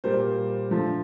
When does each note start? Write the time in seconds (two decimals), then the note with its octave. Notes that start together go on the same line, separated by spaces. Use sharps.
0.04 A#2 G3 A#3 C5
0.70 D3 F3 A3